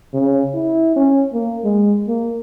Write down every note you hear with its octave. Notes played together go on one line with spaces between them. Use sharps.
C#3
E4
C#4
A#3
G#3
A#3